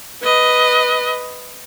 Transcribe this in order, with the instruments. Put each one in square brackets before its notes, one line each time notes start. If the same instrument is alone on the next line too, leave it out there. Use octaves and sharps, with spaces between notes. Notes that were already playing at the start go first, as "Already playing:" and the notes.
[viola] B4 D#5